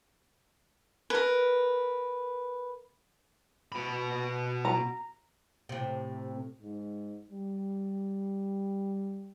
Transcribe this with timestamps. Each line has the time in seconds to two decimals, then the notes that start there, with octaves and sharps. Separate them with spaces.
1.10 A#4 B4
3.72 B2 B5
4.65 A#5
5.69 A2 C3
6.62 G#2
7.30 G3